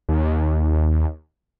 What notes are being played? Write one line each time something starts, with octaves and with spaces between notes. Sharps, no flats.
D#2